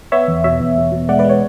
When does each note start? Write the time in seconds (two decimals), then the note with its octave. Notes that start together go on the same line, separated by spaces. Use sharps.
0.12 B3 C#5 E5
0.28 E2
0.44 B2 C#5 E5
0.60 E2
0.77 B2
0.92 B2
1.09 G#3 D5 F#5
1.19 B4 D5
1.24 G#3
1.29 C#5